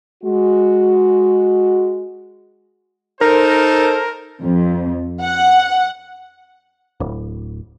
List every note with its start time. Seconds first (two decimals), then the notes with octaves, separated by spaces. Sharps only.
0.24 G#3 F#4
3.21 D#4 A4 A#4 C5
4.42 F2
5.21 F#5
7.00 D1